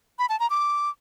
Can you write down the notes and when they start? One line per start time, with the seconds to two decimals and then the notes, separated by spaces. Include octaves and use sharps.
0.19 B5
0.29 A5
0.40 A#5
0.50 D6